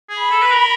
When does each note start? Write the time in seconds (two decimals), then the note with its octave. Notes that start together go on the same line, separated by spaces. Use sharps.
0.09 G#4
0.20 B5
0.31 A4
0.42 B4
0.51 A#4